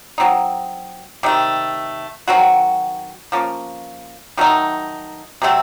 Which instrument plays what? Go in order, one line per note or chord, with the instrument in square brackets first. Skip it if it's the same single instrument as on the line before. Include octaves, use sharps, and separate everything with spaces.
[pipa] F#3 C4 D#4
C3 D#3 A3
D#3 F#3 C4 F#4
F3 A#3 C#4
D#3 F#3 A3 D#4
C3 F#3 A3 C4